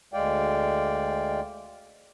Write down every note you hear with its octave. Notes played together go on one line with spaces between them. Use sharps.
D2 G#3 D5 F5 G5